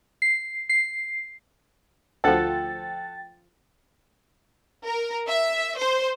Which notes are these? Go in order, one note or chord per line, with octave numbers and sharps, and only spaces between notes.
C7
C7
D2 F3 A4 F#5 G5 A6
A#4
E5
C5